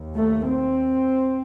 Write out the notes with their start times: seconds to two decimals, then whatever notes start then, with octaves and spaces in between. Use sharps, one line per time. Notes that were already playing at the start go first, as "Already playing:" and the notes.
Already playing: D#2
0.16 A3
0.47 C4